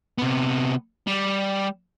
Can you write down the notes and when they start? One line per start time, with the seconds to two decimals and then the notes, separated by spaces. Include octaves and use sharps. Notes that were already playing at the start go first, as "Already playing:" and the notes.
0.18 C3 B3
1.07 G3